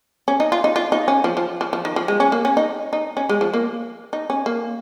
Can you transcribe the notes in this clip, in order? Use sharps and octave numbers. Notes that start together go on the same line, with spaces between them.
C#4
D#4
F4
D#4
F4
D#4
C#4
F3
F3
F3
F3
D#3
F3
G#3
C#4
A#3
C#4
D#4
D#4
C#4
G#3
F3
A#3
D#4
C#4
A#3